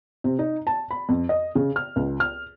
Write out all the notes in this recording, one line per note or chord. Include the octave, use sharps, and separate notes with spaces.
C3
D#4
A5
B5
F2
D#5
C#3
F6
C#2
F6